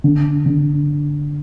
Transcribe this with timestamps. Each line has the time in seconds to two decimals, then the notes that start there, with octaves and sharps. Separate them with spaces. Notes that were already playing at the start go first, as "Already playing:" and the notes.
0.04 D3
0.46 D3